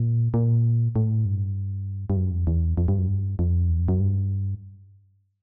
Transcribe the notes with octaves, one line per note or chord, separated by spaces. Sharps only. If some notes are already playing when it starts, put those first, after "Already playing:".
Already playing: A#2
A#2
A2
G2
G2
F#2
F2
E2
F2
G2
F#2
G2
F2
E2
F2
F#2
G2